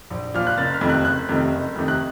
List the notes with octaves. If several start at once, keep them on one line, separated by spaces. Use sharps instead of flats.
A#1
A#2 F3 F6
F#6
F#1 A6
F6
F2 C3 D#3 A3
F#6
F#1 F#6
F2 C3 D#3 A3
F#1
F2 C3 D#3 A3
F#6